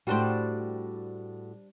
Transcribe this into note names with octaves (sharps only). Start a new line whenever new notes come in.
A2 G3 D4 F#4 C5